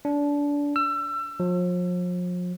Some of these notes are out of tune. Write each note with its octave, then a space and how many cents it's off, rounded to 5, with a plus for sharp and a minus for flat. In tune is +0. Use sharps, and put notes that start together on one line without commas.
D4 -25
E6 +30
F3 +40